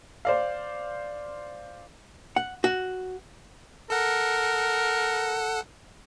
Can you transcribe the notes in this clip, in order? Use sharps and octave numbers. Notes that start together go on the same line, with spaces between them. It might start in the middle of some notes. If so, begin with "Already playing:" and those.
C5 D5 F5
F#5
F#4
A4 A#4 F#5